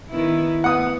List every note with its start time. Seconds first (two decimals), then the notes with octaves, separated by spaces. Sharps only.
0.10 D#3 B3 E4
0.64 B3 F#5 D#6